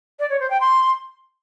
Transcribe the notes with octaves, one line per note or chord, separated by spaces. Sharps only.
D5
C#5
C5
G5
C6